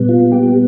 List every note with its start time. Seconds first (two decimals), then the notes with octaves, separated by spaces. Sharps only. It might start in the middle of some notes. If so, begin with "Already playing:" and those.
Already playing: A#2 G3 B3
0.09 F4
0.32 G4